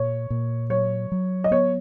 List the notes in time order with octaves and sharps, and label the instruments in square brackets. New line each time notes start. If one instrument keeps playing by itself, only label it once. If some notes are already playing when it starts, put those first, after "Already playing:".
Already playing: [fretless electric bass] A#2 [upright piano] C#5
[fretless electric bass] A#2
[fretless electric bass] F#3 [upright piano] C#5
[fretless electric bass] F#3
[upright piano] D#5
[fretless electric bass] B3 [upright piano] C#5